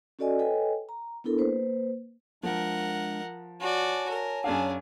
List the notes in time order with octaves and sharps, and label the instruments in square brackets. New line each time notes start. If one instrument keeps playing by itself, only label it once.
[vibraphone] C#4 F#4 A4 D5 D#5 G#5
A4 B4 C#5 D#5 G5 G#5
A#5
B3 D4 E4 A4 A#4
A#3 B4 C5
[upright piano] F3 [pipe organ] G#3 D4 [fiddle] A#4 F#5
[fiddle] F#4 D5 [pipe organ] C#5 G#5 A5
[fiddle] A#4
[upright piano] F#2 C#4 F5 [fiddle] D4 G#4